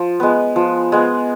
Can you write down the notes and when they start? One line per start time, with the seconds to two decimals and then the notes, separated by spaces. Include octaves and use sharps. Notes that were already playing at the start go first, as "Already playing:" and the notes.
Already playing: F3
0.20 G#3 B3
0.56 F3
0.92 G#3 B3